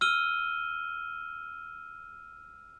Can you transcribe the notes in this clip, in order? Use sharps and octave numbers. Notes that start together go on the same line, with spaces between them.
E6 F6 D#7 G7